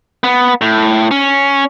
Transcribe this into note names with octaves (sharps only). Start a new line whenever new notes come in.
B3
A2
C#4